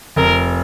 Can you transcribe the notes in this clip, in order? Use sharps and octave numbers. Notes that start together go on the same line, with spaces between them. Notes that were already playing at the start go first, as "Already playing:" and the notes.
F1 A#4